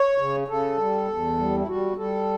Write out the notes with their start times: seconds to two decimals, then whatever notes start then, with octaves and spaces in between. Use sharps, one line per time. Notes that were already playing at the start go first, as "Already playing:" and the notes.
Already playing: C#5
0.18 C#3
0.48 C#3 A4
0.78 G3
1.08 E2
1.38 G3
1.57 E4
1.67 G3 F#4
1.97 G3 A4